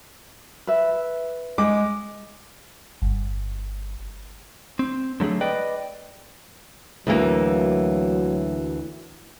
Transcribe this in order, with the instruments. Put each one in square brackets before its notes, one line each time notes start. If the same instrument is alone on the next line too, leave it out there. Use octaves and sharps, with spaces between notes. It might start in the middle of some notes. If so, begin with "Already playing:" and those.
[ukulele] B4 E5
[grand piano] G#3 D6
[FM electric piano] G1
[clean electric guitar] C4
D3 F#3 A3 G#4
B4 D5 D#5 G5
[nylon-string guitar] D2 E3 A#3 [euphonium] F#3